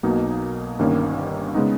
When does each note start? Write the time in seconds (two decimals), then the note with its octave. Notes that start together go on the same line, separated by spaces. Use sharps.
0.03 B1 B2 A#3 D#4
0.79 G1 G2 D#3 A#3 C#4
1.54 C#3 G#3 B3 D#4